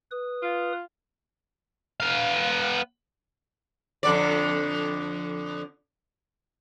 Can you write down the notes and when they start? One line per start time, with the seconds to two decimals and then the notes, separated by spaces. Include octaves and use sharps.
0.11 B4 D#6
0.43 F4
2.00 B3 F5
4.03 F2 D3 D5